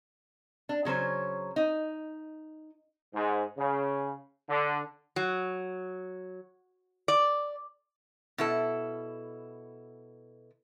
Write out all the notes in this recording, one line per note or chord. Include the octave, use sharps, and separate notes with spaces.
D4
C#3 F#3 C#4 C5
D#4
G#2
C#3
D3
F#3
D5
B2 E4 A4